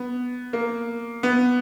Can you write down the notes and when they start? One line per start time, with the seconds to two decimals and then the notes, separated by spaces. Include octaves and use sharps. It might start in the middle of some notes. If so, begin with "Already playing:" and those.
Already playing: B3
0.53 A#3
1.23 B3